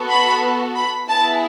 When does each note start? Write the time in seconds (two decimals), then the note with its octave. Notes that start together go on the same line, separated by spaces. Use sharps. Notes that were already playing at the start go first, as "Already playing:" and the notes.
Already playing: B3 F#4 A4
0.10 B5
0.75 B5
1.08 B3 E4 G#4 A5